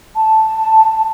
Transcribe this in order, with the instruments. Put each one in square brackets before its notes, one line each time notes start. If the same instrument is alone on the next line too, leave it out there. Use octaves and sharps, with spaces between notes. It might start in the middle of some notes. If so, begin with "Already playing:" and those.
[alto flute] A5